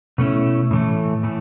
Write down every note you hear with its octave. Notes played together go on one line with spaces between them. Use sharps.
B2 A3 C#4 E4
A2 E3 A3
A2 E3 A3